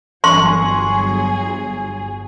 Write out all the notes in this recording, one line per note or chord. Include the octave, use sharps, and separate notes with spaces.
G1 F#3 G#4 C6 C#6